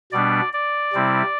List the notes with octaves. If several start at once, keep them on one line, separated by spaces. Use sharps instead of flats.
B2 G3 B3 D4 D5
D5
C3 G3 C4 E4